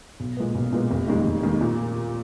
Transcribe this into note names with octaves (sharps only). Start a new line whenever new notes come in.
B1
A#2 G#3 B3
B1
A#2 G#3 B3
F1
D#2 D#3 G#3
F1
D#2 D#3 G#3
A#2